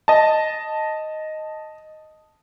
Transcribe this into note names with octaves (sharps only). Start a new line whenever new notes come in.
D#5 A5